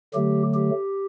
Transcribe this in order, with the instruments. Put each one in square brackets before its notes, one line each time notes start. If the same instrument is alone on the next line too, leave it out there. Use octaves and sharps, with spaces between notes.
[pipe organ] D3 F#3 A3 G4
G4